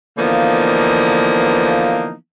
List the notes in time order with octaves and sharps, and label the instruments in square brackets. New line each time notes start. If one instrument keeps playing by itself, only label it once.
[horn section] D3 E3 F3 A#3 B3 D#4